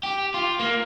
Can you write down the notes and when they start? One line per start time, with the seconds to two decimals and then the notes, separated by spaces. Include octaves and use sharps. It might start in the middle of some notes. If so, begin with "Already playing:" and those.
0.03 G4
0.34 F4
0.60 A#3